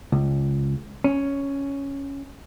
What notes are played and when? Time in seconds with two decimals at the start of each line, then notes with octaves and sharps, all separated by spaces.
0.12 C#2
1.04 C#4